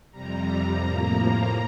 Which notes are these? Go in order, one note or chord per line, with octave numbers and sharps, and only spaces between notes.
F2 C3 G3 A#5
A2 F3 A#3